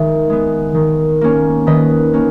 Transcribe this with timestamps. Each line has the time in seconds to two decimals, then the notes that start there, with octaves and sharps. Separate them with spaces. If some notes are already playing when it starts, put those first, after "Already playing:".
Already playing: D#3 G#3 E5
0.30 G#3 B3
0.75 D#3
1.21 A#3 C#4
1.67 D#3 B4 D#5
2.13 A#3 C#4